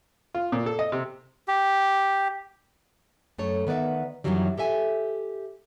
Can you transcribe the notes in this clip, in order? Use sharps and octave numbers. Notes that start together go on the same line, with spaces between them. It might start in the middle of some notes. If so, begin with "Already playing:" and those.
F4
A#2
A4
D#5
C3
G4
F#2 A3 C#5
D#3 B3 B4 D5 E5
F#2 C3 D#3 E3 F#3 G3
G4 A4 E5 G#5